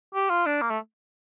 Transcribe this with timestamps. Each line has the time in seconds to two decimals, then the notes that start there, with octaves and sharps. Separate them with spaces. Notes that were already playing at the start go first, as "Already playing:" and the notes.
0.15 G4
0.30 F4
0.46 D4
0.61 A#3
0.70 A3